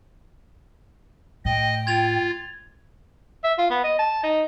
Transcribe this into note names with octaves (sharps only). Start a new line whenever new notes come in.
A2 D#5 G5
F4 G#6 A6 F7
E5
F4
B3
D#5
A5
D#4